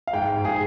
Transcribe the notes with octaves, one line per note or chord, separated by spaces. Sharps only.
F5
G#2 G5
G#2
G#4